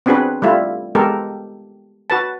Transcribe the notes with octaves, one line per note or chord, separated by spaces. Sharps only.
B3 C4 D4 F#4 G#4 B4
G3 A3 E4 F4
G#3 B3 G4 A4 A#4
F#4 B4 A5